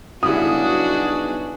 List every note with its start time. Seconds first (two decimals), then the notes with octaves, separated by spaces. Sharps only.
0.23 B1 C#3 G3 D4 E4 F#4 G#4 D#6